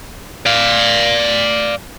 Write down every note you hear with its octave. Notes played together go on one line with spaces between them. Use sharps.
D5 F5